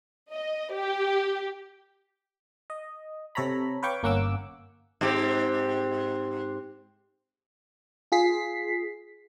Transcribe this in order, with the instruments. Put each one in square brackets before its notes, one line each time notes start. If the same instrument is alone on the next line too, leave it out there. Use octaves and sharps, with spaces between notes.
[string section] D#5
G4
[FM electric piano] D#5
C3 A4 C#5 A#5 B5
B4 C#5 F5 G5 C#6 D6
G1 A#3 C#4 F#5 D6 E6
[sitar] G#2 C4 G4
[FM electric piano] F4 G#4 B6 C7